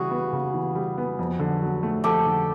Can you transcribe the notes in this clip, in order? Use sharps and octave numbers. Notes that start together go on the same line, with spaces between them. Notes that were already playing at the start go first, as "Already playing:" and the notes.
Already playing: C#3 E3 G3 F#4 G#4
B3
C#3
E3
G3
B3
F2
D3
F#3
A3
F2 G4 A4
D3